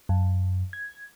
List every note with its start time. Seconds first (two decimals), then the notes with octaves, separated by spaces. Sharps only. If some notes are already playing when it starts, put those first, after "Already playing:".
0.09 F#2
0.73 G#6